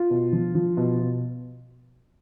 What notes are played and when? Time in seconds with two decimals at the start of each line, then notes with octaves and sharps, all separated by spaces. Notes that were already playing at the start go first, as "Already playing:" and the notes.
Already playing: F4
0.10 B2
0.33 F3
0.55 F3
0.77 B2
0.99 B2